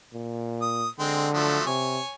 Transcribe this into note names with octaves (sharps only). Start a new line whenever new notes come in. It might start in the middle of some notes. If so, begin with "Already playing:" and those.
A#2
D#6
D3 G#3 C4
F3 F#3 A3
C3 C#5 G#5